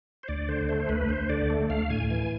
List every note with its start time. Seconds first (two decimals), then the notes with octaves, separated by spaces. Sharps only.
0.23 C5
0.28 D2 D5
0.48 D3 C5
0.69 A3 C5
0.89 D2 B4
1.09 D2 C5
1.29 D3 D5
1.50 A3
1.70 D2 F5
1.90 A2 G#5
2.10 E3 G#5